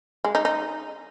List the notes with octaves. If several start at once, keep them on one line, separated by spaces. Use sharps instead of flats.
G#3
D#4
D#4